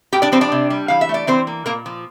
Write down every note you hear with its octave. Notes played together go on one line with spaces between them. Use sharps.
A2 G4 G5
D4 D5
F3 C4 C5
D4 D5
C3
G3
E3 F5
E5
A3
D5
E3 C4 C5
A#3
A#2 A#3 A#4
F3